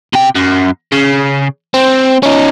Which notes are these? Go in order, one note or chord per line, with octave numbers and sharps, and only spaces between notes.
C3 G5
F#2
C#3
C4
C#4 D#4